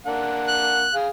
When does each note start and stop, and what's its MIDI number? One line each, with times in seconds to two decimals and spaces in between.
0.06 0.86 58
0.06 0.86 62
0.06 0.86 78
0.47 0.94 90
0.94 1.08 68
0.94 1.08 77